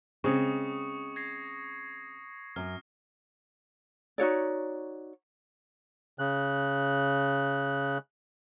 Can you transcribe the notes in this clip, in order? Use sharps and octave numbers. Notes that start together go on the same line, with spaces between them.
C#3 G#3 C4 C#6 D#6 C#7
G#6 A#6 C7
F#2 F6
D#4 F#4 C#5 D5
C#3 F#6